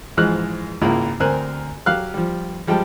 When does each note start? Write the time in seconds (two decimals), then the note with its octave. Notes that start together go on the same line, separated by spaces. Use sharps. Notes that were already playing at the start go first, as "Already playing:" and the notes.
0.17 G#2 E3 F3 G#3 F6 F#6
0.82 G#1 C#2 A#3 E4 F4
1.20 D2 C4 A#4 C5 G#5 F#6
1.86 F#3 G4 F5 F6 F#6
2.14 F3 G3
2.67 F3 G3 G#3 G5 A5